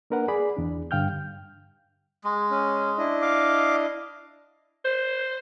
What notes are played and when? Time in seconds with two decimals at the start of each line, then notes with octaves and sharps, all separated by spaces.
0.10 A#3 D4 A#4 B4 F#5
0.28 G#4 D5 B5
0.57 E2 D4
0.91 G2 D3 F5 G5 F6 G6
2.24 G#3
2.51 C#4
2.98 D4 E4 D#5
3.22 F5 D6
4.85 C5